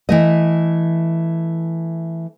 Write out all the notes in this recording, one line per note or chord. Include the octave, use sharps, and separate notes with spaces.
E3 A3 D#5